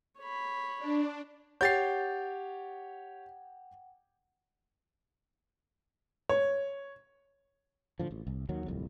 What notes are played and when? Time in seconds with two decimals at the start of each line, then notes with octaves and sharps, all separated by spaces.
0.19 C#5 B5
0.79 D4
1.61 G4 C#5 F#5 G5 G6 A6 C7
6.29 C#5
8.00 A2 D3 F3
8.11 A1
8.27 C2
8.49 D#2 D#3 F#3
8.66 D1 C2 F2